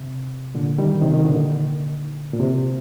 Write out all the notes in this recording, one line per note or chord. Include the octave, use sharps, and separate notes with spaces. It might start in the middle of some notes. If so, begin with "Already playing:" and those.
Already playing: C3
A#2 D3
D#3 G3
C3 D#3
D#3
A#2 D3
A#2
C3